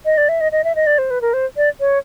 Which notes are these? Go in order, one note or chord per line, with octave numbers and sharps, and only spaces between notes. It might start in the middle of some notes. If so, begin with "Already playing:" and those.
D#5
D5
E5
D#5
D#5
E5
D#5
D5
C5
B4
A#4
C5
D5
C#5